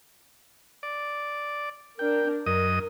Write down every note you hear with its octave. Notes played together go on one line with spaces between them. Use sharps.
D5
D4 A#4 G5
F#2 A#4 D#5 D#6